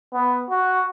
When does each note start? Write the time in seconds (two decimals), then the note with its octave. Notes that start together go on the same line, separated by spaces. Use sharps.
0.14 B3
0.50 F#4